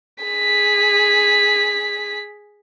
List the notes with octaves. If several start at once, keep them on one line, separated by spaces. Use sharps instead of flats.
G#4 B6